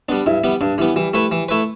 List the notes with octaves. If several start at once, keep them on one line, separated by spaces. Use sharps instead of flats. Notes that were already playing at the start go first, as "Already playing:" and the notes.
G3 B3 D4
G2 E4
G3 B3
G2 D4
E3 G3 B3
E3 G3
A3 E4 B4
E3
A3 E4 B4